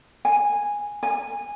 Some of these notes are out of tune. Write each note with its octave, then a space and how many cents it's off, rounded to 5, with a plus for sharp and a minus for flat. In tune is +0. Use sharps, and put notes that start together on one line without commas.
G#5 -10
G#5 -15